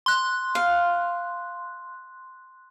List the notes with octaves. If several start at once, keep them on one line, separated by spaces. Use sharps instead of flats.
C6 F#6
F5